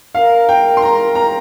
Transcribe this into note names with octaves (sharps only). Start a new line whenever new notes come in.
A#4 F5
G5
C6
A#5
A#5